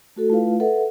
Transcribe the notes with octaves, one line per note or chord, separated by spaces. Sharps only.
A3 F#4 A4
A3 E4 F4 B4 F5
A4 B4 E5 F#5